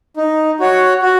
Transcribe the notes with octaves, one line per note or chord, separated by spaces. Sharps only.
D#4
F#4 C#5 F#5
F#4